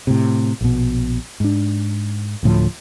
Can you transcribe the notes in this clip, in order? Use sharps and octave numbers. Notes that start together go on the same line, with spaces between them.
A2 C3
A#1 B2
G#2 D4
D1 D2 A2 F3